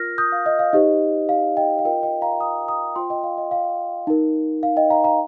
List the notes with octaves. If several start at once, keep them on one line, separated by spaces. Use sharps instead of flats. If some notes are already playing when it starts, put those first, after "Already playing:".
Already playing: F4 A#4 F6 A#6
D#6 G6
F5
D#5
F5
D#4 G4 C5 D#5
F5
D#5 G5
F5
F4 A#4 D#5 G5
D#5 G5
F5 A#5
A#5 D#6
A#5 D#6
F4 C5 G5 C6
D#5 G5
F5
D#5
F5
D#4 A#4
F5
D#5 G5
F5 A#5
F5 A#5